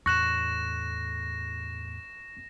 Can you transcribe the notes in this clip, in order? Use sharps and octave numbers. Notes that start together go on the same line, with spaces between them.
E2 A2 C#6 F#6 A#6 E7